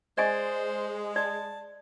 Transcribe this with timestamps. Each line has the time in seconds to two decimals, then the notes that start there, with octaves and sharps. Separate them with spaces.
0.18 G#3 C5 D5 D#5 G#5
1.16 D5 A5